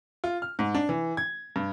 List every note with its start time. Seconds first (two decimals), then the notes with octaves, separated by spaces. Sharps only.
0.24 F4
0.42 F6
0.59 G#2
0.75 D4
0.89 E3
1.17 G#6
1.56 G2